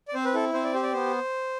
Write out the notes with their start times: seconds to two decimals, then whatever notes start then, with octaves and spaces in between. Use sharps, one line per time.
0.08 D5
0.14 C4 C5
0.25 B4
0.34 E4 A4
0.54 C4 C5
0.64 D5
0.74 G4 C5
0.83 D5
0.93 B3 C5